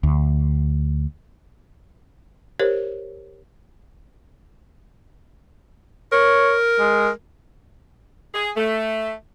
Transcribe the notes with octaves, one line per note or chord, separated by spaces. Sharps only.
D2
G4 A#4 C5 C#5
A#4 C#5
G#3
G#4
A3